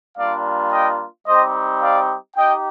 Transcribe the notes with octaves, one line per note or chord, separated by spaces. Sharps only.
G3 A#3 D4 F4 D5 F5
D#5 G5
G3 C4 D#4 G4 C5 D#5
D5 F5
D#4 G4 D#5 G5